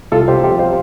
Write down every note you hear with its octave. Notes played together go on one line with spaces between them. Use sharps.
C2 F4 A4
G4 C5
C3 F3 G4 C5
C5 F5